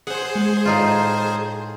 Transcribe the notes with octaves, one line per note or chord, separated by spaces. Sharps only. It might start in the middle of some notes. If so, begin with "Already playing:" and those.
G#4 C5 F#5
G#3
A2 D#4 F4